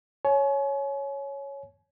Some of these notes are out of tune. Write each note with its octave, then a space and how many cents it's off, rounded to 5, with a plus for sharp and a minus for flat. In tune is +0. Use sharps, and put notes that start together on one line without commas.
C#5 +0 G#5 +35